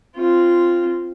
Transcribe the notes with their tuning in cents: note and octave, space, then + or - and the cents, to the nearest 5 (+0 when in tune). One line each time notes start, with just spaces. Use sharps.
C4 +0 F4 -10